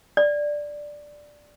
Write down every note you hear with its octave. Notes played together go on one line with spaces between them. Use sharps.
D5